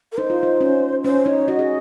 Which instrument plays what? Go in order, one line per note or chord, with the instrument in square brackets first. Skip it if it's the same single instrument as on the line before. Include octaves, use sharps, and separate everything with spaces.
[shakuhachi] A#4
[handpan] D#4 [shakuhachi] C5
[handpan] F4
D#4
C#4
[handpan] C#4 [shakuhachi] C5
[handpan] D#4 [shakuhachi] C#5
[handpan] F#4 [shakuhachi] D#5
[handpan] G#4